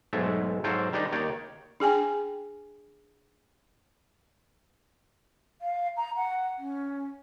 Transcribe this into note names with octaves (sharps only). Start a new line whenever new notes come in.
B1 G#2 G#3 A3 E5
G#2 F#3 F4 A4 C5 G5
D#3 G3 D4 D#4 G4
D#2 D#3 C#5 D5 G5
D4 G#4 G5 G#5
F5
A#5
F#5
C#4